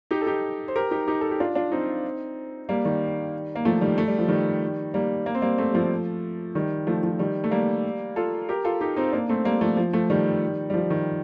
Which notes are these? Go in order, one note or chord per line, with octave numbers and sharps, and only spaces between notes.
D#4 G4
A4
D#4 G4
C5
G4 A#4
D#4 G4
D#4 G4
A4
G4
D4 F4
D4 F4
C4 D#4
G3 A#3
D#3 G3
A#3
F3 A3
D#3 G3
A3
G3
F3
D#3 G3
G3 A#3
A#3
C4
G3 A#3
A3 C4
G3
F3 A3
D#3 G3
F3 A3
F3
D#3 G3
A3
G3 A#3
F4 A4
G4 A#4
F4 A4
D#4 G4
C4 D#4
A#3 D4
A3 C4
G3 A#3
F3 A3
F3
F3 A3
D#3 G3
G3
F3
D#3